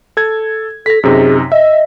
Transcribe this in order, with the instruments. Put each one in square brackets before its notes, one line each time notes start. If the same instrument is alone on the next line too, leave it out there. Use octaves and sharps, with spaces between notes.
[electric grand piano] A4 G#6
[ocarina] A4 [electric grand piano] A#6 B6
[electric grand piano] F#2 C3 D#4 [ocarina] G#4
[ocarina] D#5 [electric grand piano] E5